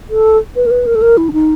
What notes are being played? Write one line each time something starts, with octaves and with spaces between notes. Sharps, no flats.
A4
B4
A#4
B4
A#4
A4
A#4
E4
D4
D#4